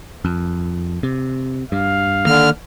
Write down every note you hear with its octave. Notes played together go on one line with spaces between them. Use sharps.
F2
C3
G2 F5
D3 D#3 A#3 F6